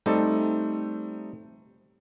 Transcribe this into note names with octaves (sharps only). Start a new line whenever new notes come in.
G3 A3 C4 D#4 A4